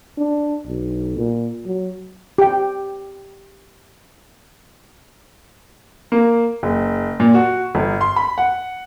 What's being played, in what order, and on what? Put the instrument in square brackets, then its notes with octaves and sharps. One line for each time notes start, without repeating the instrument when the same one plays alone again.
[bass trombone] D4
B1
A#2
F#3
[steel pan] G4 G5
[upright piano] A#3
F#1
A#2
F#4
G1
C6
B5
F#5